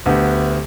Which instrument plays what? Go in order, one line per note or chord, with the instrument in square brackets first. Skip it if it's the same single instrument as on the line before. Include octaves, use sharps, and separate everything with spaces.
[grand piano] D2 D3 B3 G4